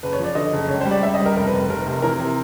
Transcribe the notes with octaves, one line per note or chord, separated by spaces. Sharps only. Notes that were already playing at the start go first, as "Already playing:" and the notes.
F#1 B4
C#5
F3 D5
D3 D#5
F#1
C#2 C#5
G3 C5
D5
C#2 E5
D#5
G3
A#4
F1 A#4
B4
F1
F1 A#4
C3
E3 A#4
C3